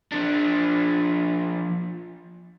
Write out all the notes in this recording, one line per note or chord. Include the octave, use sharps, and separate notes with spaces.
F3 D4